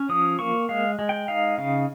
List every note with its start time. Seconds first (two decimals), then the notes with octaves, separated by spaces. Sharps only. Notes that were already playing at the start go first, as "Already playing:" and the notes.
Already playing: C#4
0.09 F3 D#6
0.39 A#3 C#6
0.69 G#3 F5
0.99 G#3
1.09 G5
1.28 D#4 F5
1.58 C#3 F5